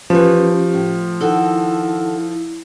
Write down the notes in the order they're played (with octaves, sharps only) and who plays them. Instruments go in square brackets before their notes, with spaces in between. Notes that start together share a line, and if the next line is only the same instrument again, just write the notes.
[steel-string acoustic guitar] E3 B4 [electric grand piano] F3 [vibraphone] C#4 G4
[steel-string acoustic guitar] A2
[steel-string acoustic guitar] D#3 F#4 A4 [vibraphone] E4